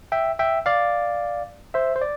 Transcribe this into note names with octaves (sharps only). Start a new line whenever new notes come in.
E5 G5
E5 G5
D5 F5
C5 E5
C5
D5